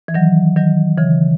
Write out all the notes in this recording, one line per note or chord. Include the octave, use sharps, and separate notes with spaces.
E3
D#3 F#3
D#3 F#3
C#3 E3